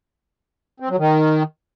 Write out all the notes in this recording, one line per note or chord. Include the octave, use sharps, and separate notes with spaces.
C4
F#3
D#3